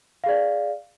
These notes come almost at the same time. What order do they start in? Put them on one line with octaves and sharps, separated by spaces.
F5 G#4 D5